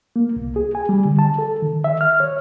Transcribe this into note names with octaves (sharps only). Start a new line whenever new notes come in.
A#3
C2
G#4
G#5
G3
D3
A5
A4
D#3
E5
F6
C#5